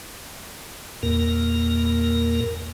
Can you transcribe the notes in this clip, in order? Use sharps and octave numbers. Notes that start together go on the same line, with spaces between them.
E2 A#2 A#3 A#4